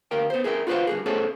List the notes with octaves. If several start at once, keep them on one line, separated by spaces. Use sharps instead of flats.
D2 A#4 F5 G5
B3 C5
G#4 A#4 E5 G5
F4 F#4 B4 C5 F5 F#5
G2 F#4 G#4
A3 C#4 G#4 A4 C5 F#5